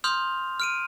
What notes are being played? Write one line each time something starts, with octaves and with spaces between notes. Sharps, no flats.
C6 D#6 F6 G6 F7
F6 D7 D#7